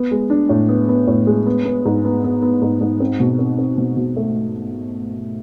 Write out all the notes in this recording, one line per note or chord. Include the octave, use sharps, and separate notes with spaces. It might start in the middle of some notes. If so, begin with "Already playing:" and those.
Already playing: B3
G#3
D4
A2
B3
B3
A2
G#3
B3
B3
G#2
B3
B3
B3
G#2
G#2
C4
B2
C4
C4
B2
B2
A3